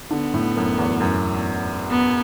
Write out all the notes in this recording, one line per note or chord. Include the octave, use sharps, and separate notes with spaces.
D3 B3
A2
F#2
E2
F#2
B3